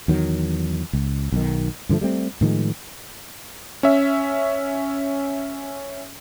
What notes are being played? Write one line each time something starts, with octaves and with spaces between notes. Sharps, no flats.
E2 D#3 F#3
C#2
B1 D#3
G2 D3 F3 A3
G3 A3 C4
A2 D#3 F3 G#3
C#4 E5